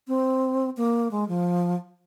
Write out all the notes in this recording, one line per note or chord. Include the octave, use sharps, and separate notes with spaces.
C4
A#3
G#3
F3